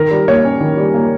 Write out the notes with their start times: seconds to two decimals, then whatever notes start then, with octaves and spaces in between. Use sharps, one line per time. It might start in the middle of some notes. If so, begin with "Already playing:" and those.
Already playing: D#3 A#4
0.11 G3
0.28 A#3 C#5
0.45 C#4
0.60 D#3
0.77 G3
0.94 A#3